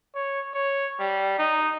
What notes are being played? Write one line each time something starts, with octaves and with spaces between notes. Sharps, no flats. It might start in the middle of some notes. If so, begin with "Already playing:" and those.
C#5
C#5
G3
D#4